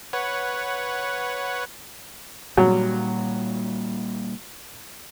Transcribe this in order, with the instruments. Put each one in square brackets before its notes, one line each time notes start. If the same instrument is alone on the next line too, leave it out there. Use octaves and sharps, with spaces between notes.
[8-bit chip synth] B4 C#5 F#5
[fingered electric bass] A#2 G3 [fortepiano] F#3